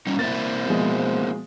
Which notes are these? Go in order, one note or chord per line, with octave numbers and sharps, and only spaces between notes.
G3 C#4 D#4
A#3 C4 E4 A6
B2 F3 G#3